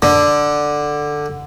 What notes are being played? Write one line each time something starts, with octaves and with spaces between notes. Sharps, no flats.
D3